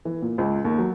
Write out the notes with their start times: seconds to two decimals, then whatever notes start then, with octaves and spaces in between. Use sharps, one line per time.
0.05 E3
0.22 A#2
0.38 C#2
0.65 D#2
0.79 F#3